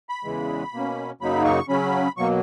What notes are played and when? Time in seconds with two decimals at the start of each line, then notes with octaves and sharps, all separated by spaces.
0.09 B5
0.25 E2 C#3 E3 G#3
0.73 B2 A#3 C#4
1.21 F#2 C#3 F#3 A#3 D#4 B5
1.45 C#6
1.69 C#3 F#3 C#4 B5
2.17 B2 F#3 A#3 C#6